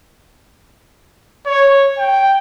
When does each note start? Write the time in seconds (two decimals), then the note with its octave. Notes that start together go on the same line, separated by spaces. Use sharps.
1.47 C#5
1.99 G5